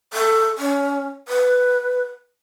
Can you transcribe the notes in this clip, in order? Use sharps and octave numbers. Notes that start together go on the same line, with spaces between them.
A4
C#4
B4